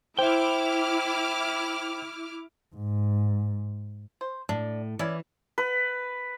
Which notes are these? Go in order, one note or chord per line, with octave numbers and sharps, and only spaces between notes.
E4 C5 E5 G5 D6 F6
G#2
C5
A2 D4
E3 C#4 E4 D5
B4